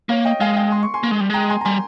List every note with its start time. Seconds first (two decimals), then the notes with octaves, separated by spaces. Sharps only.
0.09 A#3 C#5 F5
0.25 D#5 G5
0.40 G#3 F5 G#5
0.56 D#5 G5
0.72 C6
0.83 C#6
0.94 G#5 C6
1.03 A#3
1.11 G#3
1.20 G3
1.30 G#3 G5 A#5
1.50 G#5 C6
1.61 A#5
1.65 G3 G#5 C6